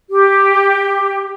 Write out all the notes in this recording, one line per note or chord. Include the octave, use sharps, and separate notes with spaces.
G4